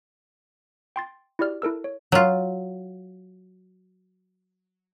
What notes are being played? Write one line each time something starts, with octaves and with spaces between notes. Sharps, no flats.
G5 C6 A6
E4 F#4 G4 D5 F6
E4 A4 A#4 E6
C#5
F#3 F4